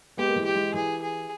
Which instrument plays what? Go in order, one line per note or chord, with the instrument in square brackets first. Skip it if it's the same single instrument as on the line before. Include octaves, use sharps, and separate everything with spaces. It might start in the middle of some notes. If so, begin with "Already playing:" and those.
[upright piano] G#3 B3 [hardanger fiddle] G4
[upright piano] A#3
E3 G#3
[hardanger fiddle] G4
[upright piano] E3 G#3
[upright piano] E3 [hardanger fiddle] G#4
[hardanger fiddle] G#4